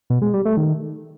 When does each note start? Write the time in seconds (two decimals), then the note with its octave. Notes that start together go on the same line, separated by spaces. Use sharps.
0.10 B2
0.22 G#3
0.33 G3
0.45 A3
0.57 D#3